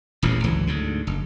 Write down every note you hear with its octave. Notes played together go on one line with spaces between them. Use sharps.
D#1 A1 E2 A2
G#1 C#2 E3 F#3
D2 G#2 D3
F#1